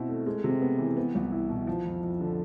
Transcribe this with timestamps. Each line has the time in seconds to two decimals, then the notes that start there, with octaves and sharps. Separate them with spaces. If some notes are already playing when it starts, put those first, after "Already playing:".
Already playing: B2 C4 E4
0.08 A3
0.27 G#3
0.44 C3
0.61 B3
0.79 E3
0.97 B3
1.15 C2
1.32 E4
1.49 B2
1.67 F3
1.85 F2
2.03 F2
2.21 D3